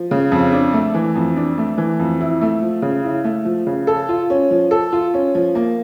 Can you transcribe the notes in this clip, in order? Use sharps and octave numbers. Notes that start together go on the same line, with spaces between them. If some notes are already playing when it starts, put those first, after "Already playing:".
Already playing: F3
C#3
F2
D4
A3
E3
F2
D4
A3
E3
F2
E4
A3
F3
C#3
E4
A3
F3
C#3
A4
F4
C#4
F3
A4
F4
C#4
F3
A#3